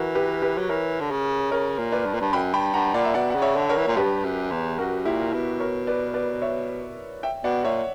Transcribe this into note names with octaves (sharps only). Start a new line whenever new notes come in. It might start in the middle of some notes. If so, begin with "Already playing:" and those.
Already playing: E3 F#4 A#4
G4 B4
G4 B4
F#3
E3 A#4 C#5
D3
C#3
C#3 A#4 C#5
A#2
B4 D5
G2
A#2
G2
F#2 G5 B5
G2 G5 B5
G2 F#5 A#5
A#2 D5 F#5
E5
B2 D5 F#5
C#3 F#5
C#5 E5
D3
A#4 C#5
E3
A#2
G2 G4 B4
F#2
E2
F#2 F#4 A#4
A#2 E4 G4
B2
A#4 C#5
B4 D5
B4 D5
C#5 E5
E5 G5
B2 D5 F#5
A#2 C#5 E5